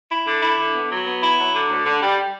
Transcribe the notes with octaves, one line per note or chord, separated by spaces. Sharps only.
E4
D3
E4
D3
B3
F#3
B3
E4
F#3
D3
D2
D3
G3